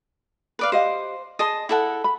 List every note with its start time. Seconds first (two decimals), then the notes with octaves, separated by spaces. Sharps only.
0.59 B4 D5 F5
0.72 G4 C5 D#5 F5
1.39 G#4 D#5 A5 C6
1.69 E4 A4 F#5
2.04 B5